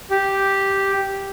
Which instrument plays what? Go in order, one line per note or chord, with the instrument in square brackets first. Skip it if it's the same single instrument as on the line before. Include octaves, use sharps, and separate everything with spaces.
[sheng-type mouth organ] G4